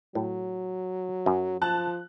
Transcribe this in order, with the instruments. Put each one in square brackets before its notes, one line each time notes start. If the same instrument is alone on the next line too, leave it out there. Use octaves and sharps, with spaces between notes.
[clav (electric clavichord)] A2 [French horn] F#3
[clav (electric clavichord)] F#2
[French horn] F3 [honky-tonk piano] A5 F#6